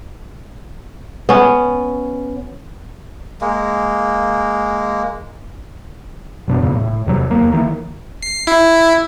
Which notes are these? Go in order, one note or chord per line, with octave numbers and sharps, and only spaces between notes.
B3 C#4
G#3 A#3
F#2 B2 D4
E2 A#2 C#3
A2
E2 C3 F#3
E2 A#3
D#3 E3 A#3
C7
E4